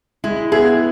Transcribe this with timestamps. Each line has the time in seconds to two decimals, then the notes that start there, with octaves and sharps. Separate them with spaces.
0.24 G#3 E4
0.52 B3 E4 G#4